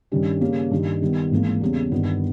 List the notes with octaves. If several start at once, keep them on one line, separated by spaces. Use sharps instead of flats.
G2 D#3 G3 C#4
C#3 G3 A#3 C#4
G2 D#3 G3
D#3 G3 B3
G#1 G#2 E3 A#3
E2 C#3 G3
G1 G2 D#3 G3 B3